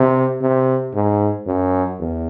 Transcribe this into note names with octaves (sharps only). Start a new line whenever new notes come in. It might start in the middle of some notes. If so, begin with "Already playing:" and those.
Already playing: C3
C3
G#2
F#2
E2